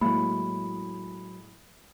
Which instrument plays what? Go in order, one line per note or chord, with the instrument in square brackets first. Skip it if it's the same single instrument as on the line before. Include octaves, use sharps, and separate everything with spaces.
[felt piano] A2 G#3 [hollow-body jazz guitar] F#3 E4 [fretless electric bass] A#3 [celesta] B5